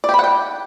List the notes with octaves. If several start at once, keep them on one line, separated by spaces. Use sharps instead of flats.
D5
G4
B5
F#5
G5